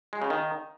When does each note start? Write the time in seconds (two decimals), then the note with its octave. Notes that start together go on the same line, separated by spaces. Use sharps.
0.13 G#3
0.22 C#3
0.30 D#3